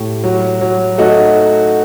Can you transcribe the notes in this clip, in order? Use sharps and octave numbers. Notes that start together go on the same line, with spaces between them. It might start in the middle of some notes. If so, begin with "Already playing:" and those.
Already playing: A2 G4
F#3
F#3
A3 D#4 F#4